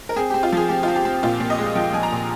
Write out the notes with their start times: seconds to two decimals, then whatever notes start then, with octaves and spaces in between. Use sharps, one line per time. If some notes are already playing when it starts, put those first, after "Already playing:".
0.09 A#4
0.16 C4 G#4
0.30 C4 G4
0.43 F4
0.53 F3 G#4
0.69 C4 G4
0.83 F4
0.88 C4
0.96 G4
1.05 C4
1.23 A#2 F4
1.40 A#2
1.50 D#5
1.58 G#3
1.75 F3 G5
1.93 F3 G#5
2.03 A#5
2.12 A#2